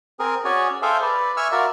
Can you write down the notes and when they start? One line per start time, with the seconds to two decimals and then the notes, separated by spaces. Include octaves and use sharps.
0.19 C4 G#4 A#4
0.45 C#4 F#4 G#4 C#5 D5
0.82 G#4 A4 C5 E5 F5 G5
1.02 B4 D5
1.37 E5 G#5 C#6 E6 F6
1.52 F4 F#4 A#4 D5 E5